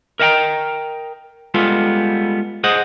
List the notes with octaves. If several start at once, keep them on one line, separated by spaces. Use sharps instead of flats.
A#4 D#5 E5 F#5 G5 A#5
G3 G#3 B3 F4 A4
G#4 C5 D#5 F#5